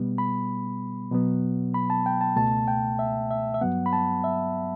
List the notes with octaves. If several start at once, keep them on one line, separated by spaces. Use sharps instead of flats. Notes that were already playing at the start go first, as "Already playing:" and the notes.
Already playing: B2 G3 B3
B5
B2 F#3 B3
B5
A5
G5
A5
C#2 B2 A3 A5
G5
E5
E5
E5
G2 F#3 B3 F#5
B5
A5
E5